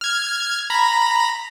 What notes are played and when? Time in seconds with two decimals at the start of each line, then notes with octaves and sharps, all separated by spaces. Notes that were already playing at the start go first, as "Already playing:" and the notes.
0.01 F6 G#6
0.70 A#5 B5